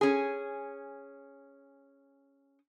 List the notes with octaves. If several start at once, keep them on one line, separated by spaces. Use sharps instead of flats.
C#4 G#4